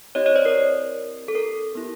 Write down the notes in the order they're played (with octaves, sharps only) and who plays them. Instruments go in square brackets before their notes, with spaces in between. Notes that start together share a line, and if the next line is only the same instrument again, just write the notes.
[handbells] C4 E4 G4 C#5 D#5
C#5 D#5
C5 D5
A#4
A4
A#4
B3 E4 G4